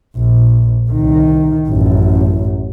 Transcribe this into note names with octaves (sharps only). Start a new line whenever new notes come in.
A#1
C2 D#3
A1 F#2